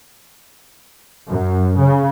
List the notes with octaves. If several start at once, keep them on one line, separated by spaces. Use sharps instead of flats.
F#2
C#3